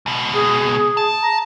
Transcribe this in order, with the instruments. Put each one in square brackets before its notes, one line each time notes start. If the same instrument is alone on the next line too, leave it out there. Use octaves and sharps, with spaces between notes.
[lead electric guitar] C#2 B2
[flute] G#4
[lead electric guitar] A5
[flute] A#5